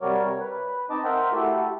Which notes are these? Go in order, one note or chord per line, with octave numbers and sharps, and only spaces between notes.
C3 G3 F#4 A#4 C#5 D5
C#5
B4
C4 D#4 D#5 A5 D6
A#4 C5 E5 F#5 G5
A3 E4 F#4 G4 A4